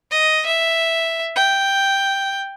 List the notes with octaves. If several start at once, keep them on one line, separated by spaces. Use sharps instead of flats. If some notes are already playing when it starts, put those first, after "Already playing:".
D#5
E5
G5